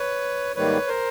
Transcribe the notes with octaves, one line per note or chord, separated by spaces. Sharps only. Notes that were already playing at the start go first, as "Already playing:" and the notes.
Already playing: B4 C#5
G#2 D#3 G3 A#3 B4 C#5
A#4 C5